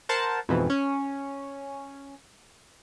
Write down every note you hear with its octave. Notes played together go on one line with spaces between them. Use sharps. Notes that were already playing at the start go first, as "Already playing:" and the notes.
A#4 C5 F#5 A5
F2 G#2 B2 E3
C#4